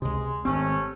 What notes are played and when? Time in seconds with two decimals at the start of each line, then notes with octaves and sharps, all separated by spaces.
0.02 C#2 C3 G#3
0.45 G#1 C3 A3 C4 C#4